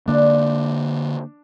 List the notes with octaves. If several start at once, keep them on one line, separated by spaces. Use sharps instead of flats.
D3 A#3 D4